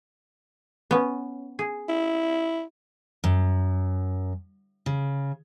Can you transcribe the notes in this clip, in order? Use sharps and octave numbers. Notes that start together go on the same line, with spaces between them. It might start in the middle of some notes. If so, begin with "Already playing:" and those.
B3 C#4
G#4
E4
F#2
C#3